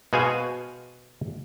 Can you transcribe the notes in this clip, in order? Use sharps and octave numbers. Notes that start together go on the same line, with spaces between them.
B2 F#4 G#4 C5 F5 G#5